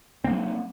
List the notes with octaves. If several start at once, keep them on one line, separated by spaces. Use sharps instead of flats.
F#3 A#3 C4